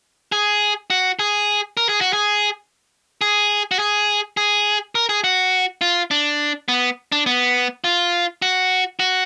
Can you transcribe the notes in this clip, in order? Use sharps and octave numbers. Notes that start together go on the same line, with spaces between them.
G#4
F#4
G#4
A#4
G#4
F#4
G#4
G#4
F#4
G#4
G#4
A#4
G#4
F#4
F4
D4
B3
D4
B3
F4
F#4
F#4